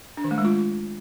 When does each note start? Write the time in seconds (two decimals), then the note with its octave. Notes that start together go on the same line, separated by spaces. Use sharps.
0.17 D4
0.24 D#3
0.31 A3
0.38 G#3
0.45 F4